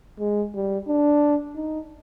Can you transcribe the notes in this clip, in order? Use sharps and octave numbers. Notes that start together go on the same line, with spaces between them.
G#3
G3
D4
D#4